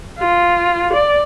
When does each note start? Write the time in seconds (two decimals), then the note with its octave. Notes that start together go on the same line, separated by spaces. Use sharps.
0.19 F4
0.93 D5